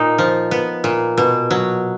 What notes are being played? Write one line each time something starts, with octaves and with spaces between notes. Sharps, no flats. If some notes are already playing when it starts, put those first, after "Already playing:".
Already playing: A#2 D#4
F3
B3
A#2
B2
F#3